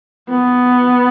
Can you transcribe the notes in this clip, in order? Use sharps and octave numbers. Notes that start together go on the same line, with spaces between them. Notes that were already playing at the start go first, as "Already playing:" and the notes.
B3